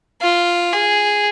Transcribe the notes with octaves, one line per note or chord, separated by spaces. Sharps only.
F4
G#4